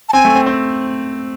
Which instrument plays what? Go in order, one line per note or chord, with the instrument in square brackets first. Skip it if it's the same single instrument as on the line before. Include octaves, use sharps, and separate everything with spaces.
[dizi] A5
[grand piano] C4 [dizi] G#5
[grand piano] A3
C4
C4